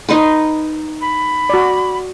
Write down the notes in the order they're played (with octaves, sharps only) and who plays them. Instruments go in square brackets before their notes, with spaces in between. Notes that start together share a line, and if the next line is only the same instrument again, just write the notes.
[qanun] D#4 B4 C6
[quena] B5
[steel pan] F#4 D5